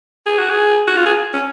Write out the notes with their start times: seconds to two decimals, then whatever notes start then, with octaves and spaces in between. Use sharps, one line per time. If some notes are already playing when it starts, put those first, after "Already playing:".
0.26 G#4
0.38 F#4
0.50 G#4
0.88 F#4
0.97 F4
1.06 G#4
1.34 C#4